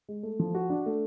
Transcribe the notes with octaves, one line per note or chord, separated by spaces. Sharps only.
G#3
A3
F3
F#4
D4
A3